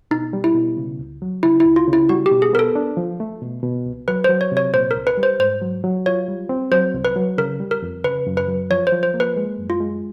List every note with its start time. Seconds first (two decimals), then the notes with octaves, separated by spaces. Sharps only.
0.11 B2 D#4
0.33 G3
0.44 E4
0.55 B2
0.77 C#3
0.99 C#2
1.22 F#3
1.43 C#3 E4
1.60 C#2 E4
1.76 F4
1.87 C#3
1.93 E4
2.09 G3 F#4
2.26 G4
2.31 B2
2.42 G#4
2.53 B3 A#4
2.59 A4
2.75 D4
2.97 F3
3.20 A3
3.42 B2
3.63 B2
3.86 C2
4.08 F#3 B4
4.24 F#3 C5
4.41 C#5
4.52 C3
4.57 C#5
4.74 A#2 C5
4.91 A#4
4.96 C2
5.07 B4
5.17 G3
5.23 C5
5.39 G#2 C5
5.62 F#3
5.84 F#3
6.06 F4 C#5
6.28 G3
6.49 C4
6.72 F#3 C5
6.94 C2
7.05 B4
7.16 F#3
7.38 C#3 A#4
7.60 G3
7.71 A#4
7.82 F2
8.04 C#3 B4
8.27 F#2
8.37 B4
8.48 F#3
8.70 F3 C#5
8.87 C5
8.92 F3
9.03 C5
9.14 A#3
9.20 B4
9.37 G#3
9.58 F#2
9.70 F4
9.81 G#3